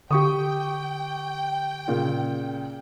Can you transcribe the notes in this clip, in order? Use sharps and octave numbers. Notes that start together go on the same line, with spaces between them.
D3 G4 G5 C#6 D#6
A#2 C#3